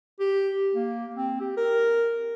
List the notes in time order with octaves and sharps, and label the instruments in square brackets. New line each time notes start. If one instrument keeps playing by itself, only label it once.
[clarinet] G4
A#3
C4
G4
A#4